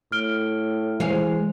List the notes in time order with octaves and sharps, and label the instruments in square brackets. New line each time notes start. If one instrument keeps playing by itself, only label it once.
[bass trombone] A2 [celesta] F6 D7 G7
[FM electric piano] E3 [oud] G#3 F5 [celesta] C5